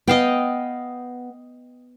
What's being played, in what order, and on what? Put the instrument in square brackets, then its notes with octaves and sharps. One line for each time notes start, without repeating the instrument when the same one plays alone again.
[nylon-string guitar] B3 [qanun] D#5 F5 G5